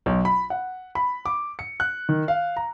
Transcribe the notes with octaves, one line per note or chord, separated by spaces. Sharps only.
B1
B5
F#5
B5
D6
C#7
F#6
D#3
F5
A#5